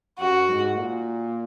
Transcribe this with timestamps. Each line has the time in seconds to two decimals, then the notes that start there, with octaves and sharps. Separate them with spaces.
0.19 F#2 F#4
0.48 G#2
0.77 A#2